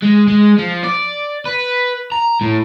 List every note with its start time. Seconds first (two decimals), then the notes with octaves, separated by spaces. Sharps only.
0.03 G#3
0.28 G#3
0.58 F3
0.83 D5
1.46 B4
2.12 A#5
2.41 A2